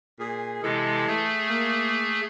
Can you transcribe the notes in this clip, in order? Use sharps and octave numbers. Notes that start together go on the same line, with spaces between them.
A#2 G#4
C3 E3 G#3 A4
A3 G#4
A#3